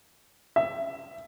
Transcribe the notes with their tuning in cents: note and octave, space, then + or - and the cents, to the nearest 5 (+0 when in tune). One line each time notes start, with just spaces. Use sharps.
E5 +20